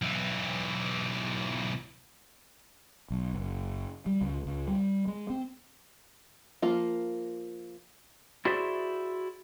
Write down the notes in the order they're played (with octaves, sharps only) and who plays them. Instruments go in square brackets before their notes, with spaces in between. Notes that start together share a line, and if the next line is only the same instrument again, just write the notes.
[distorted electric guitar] B1 E3
[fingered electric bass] B1
F#1
G3
C#2
C#2
G3
G#3
C4
[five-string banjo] F3 A#3 F4
[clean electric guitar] E4 F#4 G#4 C5 D5 E5